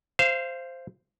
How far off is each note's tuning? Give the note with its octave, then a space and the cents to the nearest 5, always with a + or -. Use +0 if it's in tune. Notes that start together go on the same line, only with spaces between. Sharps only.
C5 +0 F5 -30